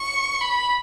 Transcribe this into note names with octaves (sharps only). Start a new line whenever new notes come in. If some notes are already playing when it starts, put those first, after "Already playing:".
Already playing: C#6
B5